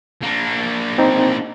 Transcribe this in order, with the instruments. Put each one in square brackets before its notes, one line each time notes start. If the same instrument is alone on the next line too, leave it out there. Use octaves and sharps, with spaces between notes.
[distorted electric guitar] A#3 D4
[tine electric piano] C4 D#4